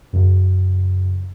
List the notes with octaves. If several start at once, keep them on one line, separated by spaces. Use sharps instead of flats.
F#2 C#3